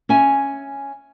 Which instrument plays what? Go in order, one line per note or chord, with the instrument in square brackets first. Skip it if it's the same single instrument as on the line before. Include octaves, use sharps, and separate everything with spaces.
[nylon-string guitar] C#4 E5 G#5